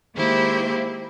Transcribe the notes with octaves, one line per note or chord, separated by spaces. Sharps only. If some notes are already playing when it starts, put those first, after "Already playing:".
D#3 G#3 A#3 E4 G4 C5